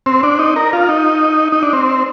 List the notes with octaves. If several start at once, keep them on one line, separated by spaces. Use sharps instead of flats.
C4
D4
D#4
A#4
F4
D#4
D#4
D4
C4